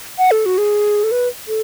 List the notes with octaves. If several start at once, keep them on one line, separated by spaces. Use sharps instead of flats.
F#5
A4
F#4
G#4
A4
B4
A4